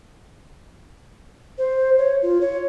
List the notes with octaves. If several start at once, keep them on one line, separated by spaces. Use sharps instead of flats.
C5
C#5
F4
C#5